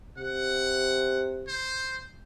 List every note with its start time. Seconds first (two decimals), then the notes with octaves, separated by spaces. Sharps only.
0.18 C3 F#5
1.48 C5